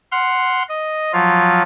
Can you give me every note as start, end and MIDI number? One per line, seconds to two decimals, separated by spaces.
0.12 0.63 78
0.12 0.63 84
0.12 0.63 89
0.69 1.12 75
1.13 1.62 53
1.13 1.62 54
1.13 1.62 65